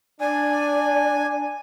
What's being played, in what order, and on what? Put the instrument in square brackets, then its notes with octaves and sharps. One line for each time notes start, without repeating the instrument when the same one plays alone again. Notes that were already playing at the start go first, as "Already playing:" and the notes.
[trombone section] D4 [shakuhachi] D5 [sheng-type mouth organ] G#5